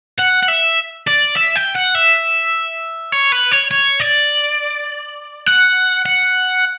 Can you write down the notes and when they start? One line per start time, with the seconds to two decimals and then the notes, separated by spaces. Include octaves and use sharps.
0.18 F#5
0.43 F#5
0.48 E5
1.07 D5
1.36 E5
1.56 G5
1.75 F#5
1.95 E5
3.12 C#5
3.32 B4
3.52 C#5
3.71 C#5
4.00 D5
5.47 F#5
6.06 F#5